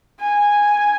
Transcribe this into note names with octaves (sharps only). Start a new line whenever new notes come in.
G#5